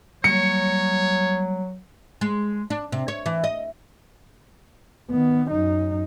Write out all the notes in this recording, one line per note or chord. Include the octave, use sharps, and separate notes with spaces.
F#3 G3 A#3 C#5 C#7
G#3
D4
C3
C#5
E3
D#5
D#3 B3
F#2 D#4